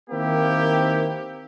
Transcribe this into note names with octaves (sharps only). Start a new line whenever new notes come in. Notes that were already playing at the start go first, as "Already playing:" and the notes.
D#3 A#3 C4 E4 G4